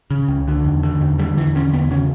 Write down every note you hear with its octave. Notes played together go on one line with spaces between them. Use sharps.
C#3
C#2
D3
E2
D3
E2
D3 G3
E2 E3
D3 C#4
E2 B3
C#3 C#4